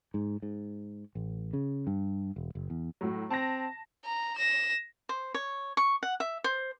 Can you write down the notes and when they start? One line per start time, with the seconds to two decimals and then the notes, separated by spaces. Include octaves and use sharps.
0.14 G#2
0.42 G#2
1.15 A1
1.53 C#3
1.87 G2
2.36 E1
2.55 F#1
2.70 E2
3.01 A2 F#3
3.30 C4 A5 A#6
4.05 A#5
4.36 A#6 E7
5.09 C5
5.34 C#5
5.77 C#6
6.03 F#5
6.20 E5
6.44 C5